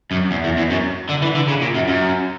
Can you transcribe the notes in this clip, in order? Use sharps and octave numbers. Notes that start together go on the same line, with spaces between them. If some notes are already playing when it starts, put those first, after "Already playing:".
F#2
E2
E2
E2
F#2
D3
E3
D3
C#3
A#2
F#2
F#2